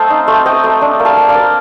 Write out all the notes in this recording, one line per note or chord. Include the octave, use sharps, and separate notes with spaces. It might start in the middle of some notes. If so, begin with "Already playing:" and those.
Already playing: A3 C4 D#5 F5 G5 A5
D#4
A3
C4 D#5 G5
A3
D4
A#3
F5 A5
A#3
D5 F5
A#3